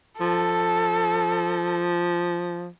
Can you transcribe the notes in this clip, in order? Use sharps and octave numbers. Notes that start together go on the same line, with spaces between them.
F3 A4